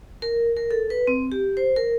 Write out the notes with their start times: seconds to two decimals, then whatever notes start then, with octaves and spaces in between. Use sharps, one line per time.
0.22 A#4
0.57 A#4
0.71 A4
0.90 B4
1.07 C4
1.32 G4
1.57 C5
1.76 A#4